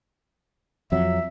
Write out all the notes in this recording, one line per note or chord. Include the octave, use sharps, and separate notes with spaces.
F2 F#3 E5